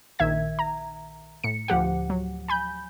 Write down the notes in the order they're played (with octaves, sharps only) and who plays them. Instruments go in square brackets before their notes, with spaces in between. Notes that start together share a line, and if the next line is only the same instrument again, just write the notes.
[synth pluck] A#1 D#3 E5 G#6
A#5
A2 C#7
D2 F3 G4 F#5
F#3
G#5 B5 G6